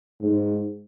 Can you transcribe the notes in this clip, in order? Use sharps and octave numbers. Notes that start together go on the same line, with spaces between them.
G#2